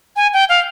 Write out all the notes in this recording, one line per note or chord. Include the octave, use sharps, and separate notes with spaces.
G#5
G5
F5